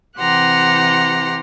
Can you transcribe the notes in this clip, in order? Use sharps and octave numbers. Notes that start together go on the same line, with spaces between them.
C3 E3 G4 F#5 A#5 C6